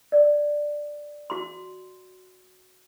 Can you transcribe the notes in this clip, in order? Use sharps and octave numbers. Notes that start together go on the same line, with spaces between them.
D5
F#4 C6